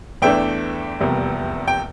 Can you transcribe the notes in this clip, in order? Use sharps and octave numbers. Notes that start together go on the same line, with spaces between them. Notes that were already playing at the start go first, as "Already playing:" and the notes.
E2 E3 A3 D4 E5 G5
F1 E2 C3 G3 A#3
G5